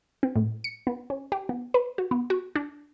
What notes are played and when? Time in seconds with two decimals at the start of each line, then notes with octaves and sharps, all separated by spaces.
0.23 C4
0.36 A2
0.64 C#7
0.87 B3
1.10 C#4
1.32 G4
1.49 B3
1.74 B4
1.98 F#4
2.11 B3
2.30 F#4
2.56 D4